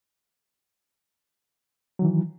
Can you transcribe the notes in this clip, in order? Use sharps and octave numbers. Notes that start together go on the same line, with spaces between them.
D#3 E3 F#3